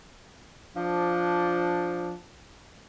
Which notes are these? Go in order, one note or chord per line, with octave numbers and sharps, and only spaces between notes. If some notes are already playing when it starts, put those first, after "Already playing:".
F3 D4